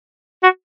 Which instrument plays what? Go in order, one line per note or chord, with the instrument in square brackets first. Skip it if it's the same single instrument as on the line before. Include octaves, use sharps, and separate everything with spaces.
[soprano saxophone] F#4